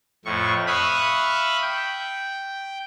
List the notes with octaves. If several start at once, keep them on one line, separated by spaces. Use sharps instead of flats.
F2 A2 C#6
E5 F5 B5 C#6 D#6 F#6
G5